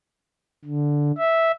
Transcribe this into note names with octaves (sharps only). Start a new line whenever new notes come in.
D3
E5